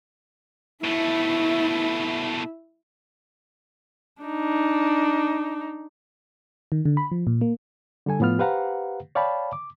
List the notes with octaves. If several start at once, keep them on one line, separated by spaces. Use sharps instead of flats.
B2 A3 E4
D4 D#4
D#3
D3
B5
F3
A#2
A#3
D3 G3 A4 G#5
A2 F3 B3 F4 F6
G4 B4 C5 F5 F#5 A#5
C#5 D5 F5 G5 A5 B5
D6